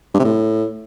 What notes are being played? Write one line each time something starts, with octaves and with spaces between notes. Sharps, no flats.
G2
C3
A2